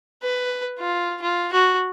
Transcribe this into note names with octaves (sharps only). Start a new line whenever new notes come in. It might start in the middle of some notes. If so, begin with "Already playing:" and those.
B4
F4
F4
F#4